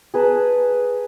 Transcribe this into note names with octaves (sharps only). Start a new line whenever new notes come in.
G#4 B4 A5 A#5